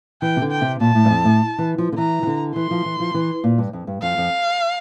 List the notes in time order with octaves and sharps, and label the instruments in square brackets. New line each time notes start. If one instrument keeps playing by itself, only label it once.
[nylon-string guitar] E3 [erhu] G5
[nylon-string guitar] C3
D3
[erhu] G5
[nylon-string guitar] C3
[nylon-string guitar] A#2 [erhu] A5
[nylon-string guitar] A2
G2
F2
A2
E3
F3
D3
[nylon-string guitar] E3 [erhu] A#5
[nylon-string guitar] E3
D3
[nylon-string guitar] E3 [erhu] C6
[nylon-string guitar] F3
E3
F3
E3
A#2
G2
F2
G2
[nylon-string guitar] F2 [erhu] F5
[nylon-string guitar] F2